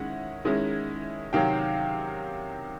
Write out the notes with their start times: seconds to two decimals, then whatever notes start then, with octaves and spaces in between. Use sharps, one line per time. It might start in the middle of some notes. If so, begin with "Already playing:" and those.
Already playing: D#3 G#3 C#4 E4 F#5
0.45 D#3 G#3 C#4 E4
1.33 C3 D#3 F#3 F5 G5